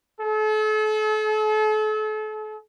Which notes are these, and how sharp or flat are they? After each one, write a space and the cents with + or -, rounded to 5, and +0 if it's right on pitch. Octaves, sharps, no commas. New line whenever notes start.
A4 -40